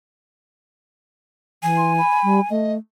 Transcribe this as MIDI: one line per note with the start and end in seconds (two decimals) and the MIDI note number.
1.63 2.00 52
1.63 2.48 80
1.77 1.93 84
1.98 2.41 83
2.24 2.40 55
2.50 2.78 57
2.50 2.74 75